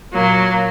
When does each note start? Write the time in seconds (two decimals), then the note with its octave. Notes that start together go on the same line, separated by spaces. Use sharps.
0.13 A#2 F#3 A#3